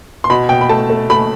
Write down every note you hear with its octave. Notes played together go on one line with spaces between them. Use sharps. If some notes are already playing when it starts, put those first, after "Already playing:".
C6
B2 B5
B2 G5
B5
A3 A5
A3
A3 B5